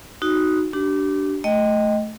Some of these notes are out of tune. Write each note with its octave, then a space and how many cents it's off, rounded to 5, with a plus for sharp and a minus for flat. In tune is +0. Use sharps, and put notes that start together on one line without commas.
D#4 +0 F#4 +0
D4 +0 G4 -35
A3 -15 D#5 +0 G5 +0